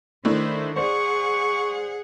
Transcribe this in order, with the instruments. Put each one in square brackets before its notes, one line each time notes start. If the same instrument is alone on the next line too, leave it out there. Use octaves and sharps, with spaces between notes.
[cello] D#3 C5 [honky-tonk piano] A3 D4 E4
[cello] G#4 F#5 [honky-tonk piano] C5 D5 [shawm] C#6